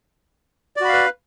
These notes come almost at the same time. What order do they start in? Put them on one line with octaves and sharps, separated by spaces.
D5 F#4 B5 F5 B4